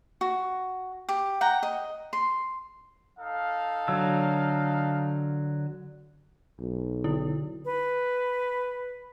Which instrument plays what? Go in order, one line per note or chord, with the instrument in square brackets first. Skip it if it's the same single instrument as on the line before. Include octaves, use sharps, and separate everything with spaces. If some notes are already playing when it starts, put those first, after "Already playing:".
[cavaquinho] F#4
G4
F#5 G5 A#5
D#5
C6
[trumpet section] D#4 A4 F5
[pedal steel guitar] D3 F#3 E6
[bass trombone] B1
[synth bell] D3 E4
[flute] B4